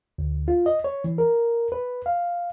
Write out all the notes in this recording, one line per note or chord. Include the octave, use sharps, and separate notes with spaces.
D2
F4
D#5
C#5
E3
A#4
B4
F5